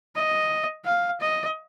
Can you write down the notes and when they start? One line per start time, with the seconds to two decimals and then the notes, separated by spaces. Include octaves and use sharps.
0.15 D#5
0.85 F5
1.20 D#5